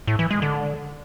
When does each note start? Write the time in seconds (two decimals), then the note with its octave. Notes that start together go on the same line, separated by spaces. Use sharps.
0.07 A2
0.19 E3
0.31 G#3
0.42 D3